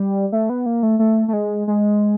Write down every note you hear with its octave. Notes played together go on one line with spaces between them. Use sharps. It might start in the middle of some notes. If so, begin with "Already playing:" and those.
Already playing: G3
A3
B3
A#3
A3
A3
A3
G#3
G#3